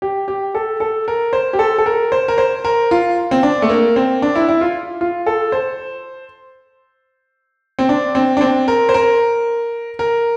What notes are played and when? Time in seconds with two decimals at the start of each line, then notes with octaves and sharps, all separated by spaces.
0.02 G4
0.28 G4
0.55 A4
0.80 A4
1.08 A#4
1.33 C5
1.53 G4
1.59 A4
1.78 A4
1.86 A#4
2.12 C5
2.28 A#4
2.38 C5
2.65 A#4
2.91 F4
3.31 C4
3.43 D4
3.62 A3
3.69 A#3
3.96 C4
4.22 D4
4.35 E4
4.49 E4
4.61 F4
5.01 F4
5.26 A4
5.52 C5
7.79 C4
7.89 D4
8.15 C4
8.37 D4
8.41 C4
8.68 A#4
8.89 C5
8.94 A#4
9.99 A#4